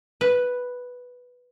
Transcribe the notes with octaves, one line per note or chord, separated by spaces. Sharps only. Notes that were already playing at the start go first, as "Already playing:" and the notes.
B4